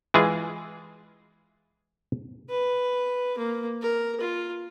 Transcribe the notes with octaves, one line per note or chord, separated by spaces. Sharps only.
E3 G#3 F4 G#4
B4
A#3
A#4
F4